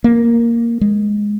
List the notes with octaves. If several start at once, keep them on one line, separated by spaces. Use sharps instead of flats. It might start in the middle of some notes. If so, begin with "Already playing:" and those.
A#3
G#3